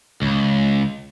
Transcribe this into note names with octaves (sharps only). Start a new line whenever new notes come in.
C#2